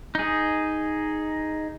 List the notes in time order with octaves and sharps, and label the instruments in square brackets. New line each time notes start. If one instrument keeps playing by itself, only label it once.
[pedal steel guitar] D#4 G#4